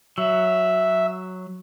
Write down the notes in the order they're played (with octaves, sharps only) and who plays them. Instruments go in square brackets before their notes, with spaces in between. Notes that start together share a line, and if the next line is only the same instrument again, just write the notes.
[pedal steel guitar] F#3 [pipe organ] E5